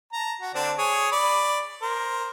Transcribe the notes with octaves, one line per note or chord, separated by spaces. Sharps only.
A5 A#5
F#4
D3 C4 D4
G#4 C#5 G#5
D5 B5
A#4 C5